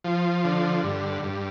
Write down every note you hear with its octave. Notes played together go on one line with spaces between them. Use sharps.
F3
D3
G2
G2